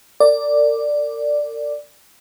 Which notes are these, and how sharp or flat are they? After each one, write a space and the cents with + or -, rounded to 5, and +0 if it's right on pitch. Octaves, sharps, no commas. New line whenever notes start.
A#4 -40 D5 +0